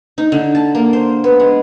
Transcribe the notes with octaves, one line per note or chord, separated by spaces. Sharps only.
D#4
D3
A5
A#3
C5
B3
G#3